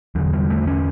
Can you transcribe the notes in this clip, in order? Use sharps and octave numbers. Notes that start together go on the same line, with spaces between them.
E2 D3 F#3
G3
A3
C#4